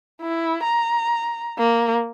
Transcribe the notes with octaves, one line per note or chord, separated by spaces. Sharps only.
E4
A#5
A#3